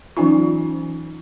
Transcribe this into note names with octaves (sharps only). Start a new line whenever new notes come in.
E3 F#3 C#4 D#4 F4